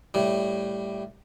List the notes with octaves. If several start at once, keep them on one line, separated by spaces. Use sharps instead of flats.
A2 G3